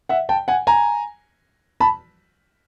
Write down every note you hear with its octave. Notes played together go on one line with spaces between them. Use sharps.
E5 F#5
G5 A5
F#5 G#5
G#5 A#5
A5 B5